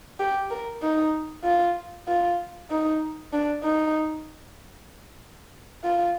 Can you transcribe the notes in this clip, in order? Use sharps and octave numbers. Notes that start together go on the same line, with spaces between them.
G4
A#4
D#4
F4
F4
D#4
D4
D#4
F4